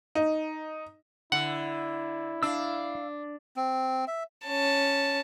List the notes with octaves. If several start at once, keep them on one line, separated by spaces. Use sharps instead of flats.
D#4
D3 E4 F#5
D4 F5 E6
C4
E5
C#4 A5